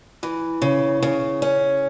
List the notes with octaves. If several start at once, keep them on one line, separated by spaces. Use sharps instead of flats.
E3
C#3
C#3
C#4